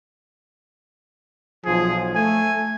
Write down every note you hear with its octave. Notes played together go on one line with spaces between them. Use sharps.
B1 F3 G#4
A3 G#5